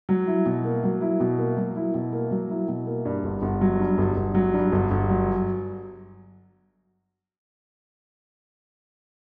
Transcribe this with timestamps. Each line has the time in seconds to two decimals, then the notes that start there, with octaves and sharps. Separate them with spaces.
0.09 F#3
0.27 E4
0.46 B2
0.65 A#3
0.83 F#3
1.01 E4
1.20 B2
1.38 A#3
1.57 F#3
1.76 E4
1.94 B2
2.13 A#3
2.31 F#3
2.50 E4
2.68 B2
2.87 A#3
3.05 G2
3.24 G1
3.42 G1
3.61 F#3
3.79 G2
3.98 G1
4.16 G1
4.35 F#3
4.54 G2
4.72 G1
4.91 G1
5.09 F#3